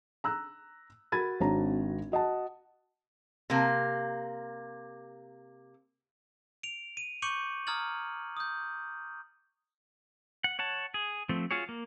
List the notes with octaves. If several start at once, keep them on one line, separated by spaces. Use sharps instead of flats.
A#5 E6 F#6
F#4 A#4 B5 G#6 A6 D#7
G#1 C4 D4 F#4 C#5 A#5
F#4 D#5 F#5 A5
C3 A#3
D7 F7
D#7
C#6 D6 G6 C#7 D#7 F#7
A#5 D#6 F6 G#6 A6 F#7
D#6 G6
F#5
C#5 F#5 A5
G#4
F3 A3 C4
F4 F#4 G#4 C#5
A#3